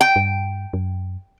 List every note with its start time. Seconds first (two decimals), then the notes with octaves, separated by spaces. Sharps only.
0.01 G5
0.16 G2
0.73 F#2